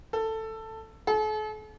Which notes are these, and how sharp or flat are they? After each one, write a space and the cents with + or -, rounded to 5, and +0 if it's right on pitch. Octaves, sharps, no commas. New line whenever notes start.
A4 +10
A4 -45